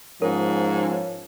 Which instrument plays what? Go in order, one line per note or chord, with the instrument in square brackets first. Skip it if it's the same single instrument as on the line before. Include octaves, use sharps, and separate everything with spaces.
[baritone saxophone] G#2 [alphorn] F3 [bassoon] C#4 [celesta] A#4